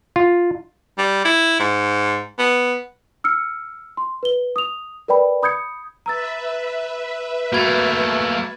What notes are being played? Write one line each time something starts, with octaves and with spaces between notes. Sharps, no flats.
F4
G3
E4
G#2
B3
E6 F6 C#7
C6
B4 G7
D#6 F7
A#4 B4 D5 G5 B5
B5 D#6 G6 G#6 C#7
B4 E5 A#5 E6 A6
A3 A#3 F#4 B5 G#6 A6